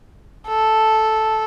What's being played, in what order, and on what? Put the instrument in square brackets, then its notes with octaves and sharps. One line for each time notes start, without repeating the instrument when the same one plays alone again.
[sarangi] A4